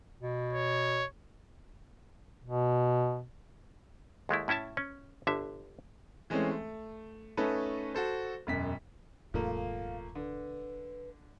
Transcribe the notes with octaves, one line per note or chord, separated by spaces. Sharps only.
B2
C#5
B2
D#2 G#3 A3 E4
A2 C#4 E4 E5 A5
C#4
G1 D3 E5
E3 G#3 A3 C4 C#4
A3
A3 C#4 D#4 A4 B4
F#4 A4 C5
E1 F#2 B6
D1 G2 B2 F3 A3 A#3 F5
F5
D3 B4